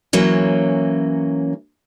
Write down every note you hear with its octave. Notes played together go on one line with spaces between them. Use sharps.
E3 F#3 A#3 C#4